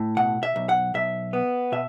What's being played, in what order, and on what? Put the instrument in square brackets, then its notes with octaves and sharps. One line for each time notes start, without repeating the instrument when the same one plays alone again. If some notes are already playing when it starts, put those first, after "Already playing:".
Already playing: [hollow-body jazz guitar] A2
B2 F#5
E5
B1
F#5
B1 E5
B3
B2 E5